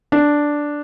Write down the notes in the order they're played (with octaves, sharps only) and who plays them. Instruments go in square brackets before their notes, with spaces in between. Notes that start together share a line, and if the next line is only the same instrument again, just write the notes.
[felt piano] D4